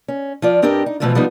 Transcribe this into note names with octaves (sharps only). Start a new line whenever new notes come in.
C#4
F3 F4 D5
G2 C4 D4 G4 A#4 D#5
D#4
B2 E3 F3 A3 C4 F4
F3 G3 B3 D#4